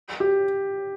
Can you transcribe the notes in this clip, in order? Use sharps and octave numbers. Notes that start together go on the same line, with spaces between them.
G4